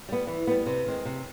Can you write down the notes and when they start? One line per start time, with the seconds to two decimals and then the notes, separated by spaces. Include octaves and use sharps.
0.09 G3 B3
0.27 E3
0.47 G3 B3
0.66 C3
0.86 D#3 G#3 C4
1.05 C3